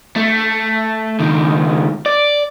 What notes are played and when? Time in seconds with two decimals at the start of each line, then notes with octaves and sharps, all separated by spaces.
0.16 A3
1.20 C#2 D#3
2.06 D5